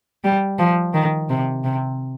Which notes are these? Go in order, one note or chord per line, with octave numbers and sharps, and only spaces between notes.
G3
F3
D#3
C3
C3